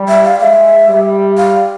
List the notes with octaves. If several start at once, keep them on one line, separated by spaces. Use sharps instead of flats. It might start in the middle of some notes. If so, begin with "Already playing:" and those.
Already playing: G3
E5
F5
G#3 E5
G3
F5